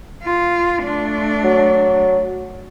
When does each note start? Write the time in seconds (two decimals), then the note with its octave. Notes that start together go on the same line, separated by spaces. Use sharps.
0.23 F4
0.80 A3 D4
1.44 F#3